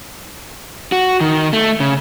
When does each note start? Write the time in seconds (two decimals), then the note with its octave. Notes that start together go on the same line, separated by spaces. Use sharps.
0.92 F#4
1.21 D#3
1.53 A3
1.80 C#3